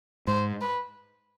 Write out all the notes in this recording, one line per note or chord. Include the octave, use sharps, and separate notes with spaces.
G#2 C5
B4